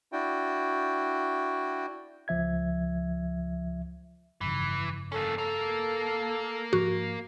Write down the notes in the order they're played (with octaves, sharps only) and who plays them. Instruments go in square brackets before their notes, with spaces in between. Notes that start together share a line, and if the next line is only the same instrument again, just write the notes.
[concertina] D4 E4 F#4 G5
[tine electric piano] C#2 F3 E5 G#6
[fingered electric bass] G1 F2 C#3 [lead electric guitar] E3
[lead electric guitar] A#3 C#4 [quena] A4
[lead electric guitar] A#3 A#4 [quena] A4
[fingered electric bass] G#2 F3 D4 [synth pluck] F#4